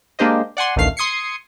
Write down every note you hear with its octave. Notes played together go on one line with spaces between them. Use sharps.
G#3 A#3 D4 G4 C5 D#5
D5 F#5 G#5 C6
A1 D2 D#3 A3 F5 C7
C6 D#6 G#6 C7 C#7